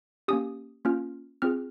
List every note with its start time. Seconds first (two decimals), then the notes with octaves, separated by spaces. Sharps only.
0.28 A#3 C#4 G4 D#6
0.85 A#3 C#4 F4 F6
1.42 C4 F4 G#4 F6